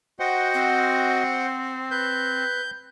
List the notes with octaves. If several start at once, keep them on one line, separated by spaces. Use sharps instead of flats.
F#4 C5 D#5 F#5 G5
C4
B4 G6